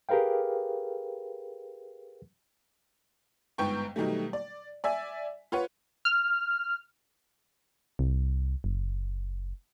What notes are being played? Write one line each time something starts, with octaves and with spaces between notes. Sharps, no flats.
G4 G#4 A#4 B4 F5 G5
G1 G#2 B3 G5 C#6
B2 D#3 F#3 G3 A3
D5
D5 E5 G#5
F4 B4 C#5 F#5
F6
C2
F#1